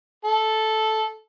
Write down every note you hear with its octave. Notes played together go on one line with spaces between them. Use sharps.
A4